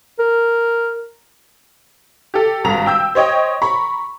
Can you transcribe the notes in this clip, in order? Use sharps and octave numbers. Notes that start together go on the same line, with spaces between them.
A#4
G4 A4
G#1 G2 A#5 F7
G5 E6 G6
C5 C#5 D#5 G5
A#5 B5 C#6